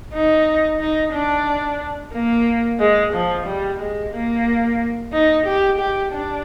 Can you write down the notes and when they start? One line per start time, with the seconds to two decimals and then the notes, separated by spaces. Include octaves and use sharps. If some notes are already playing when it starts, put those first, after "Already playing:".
0.14 D#4
0.80 D#4
1.13 D4
2.14 A#3
2.79 G#3
3.13 F3
3.47 G3
3.80 G#3
4.13 A#3
5.13 D#4
5.46 G4
5.78 G4
6.13 D4